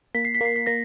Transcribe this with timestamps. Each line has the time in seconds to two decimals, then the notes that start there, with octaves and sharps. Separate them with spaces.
0.15 A#3 B6
0.25 C7
0.34 B6
0.41 A#3 C7
0.56 B6
0.66 A#3 A#6